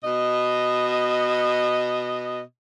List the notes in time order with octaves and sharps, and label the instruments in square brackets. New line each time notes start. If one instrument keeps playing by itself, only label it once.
[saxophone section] B2 D#5